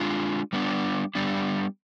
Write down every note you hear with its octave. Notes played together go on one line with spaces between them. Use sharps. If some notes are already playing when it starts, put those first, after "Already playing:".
Already playing: G#3 D4 F4
G3 B3 D4
G3 B3 D4